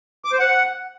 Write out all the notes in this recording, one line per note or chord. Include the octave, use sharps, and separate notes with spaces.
D6
C5
F#5